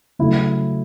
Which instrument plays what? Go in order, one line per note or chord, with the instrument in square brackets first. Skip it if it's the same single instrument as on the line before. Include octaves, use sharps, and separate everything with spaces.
[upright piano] C#3 F#3 A3 E4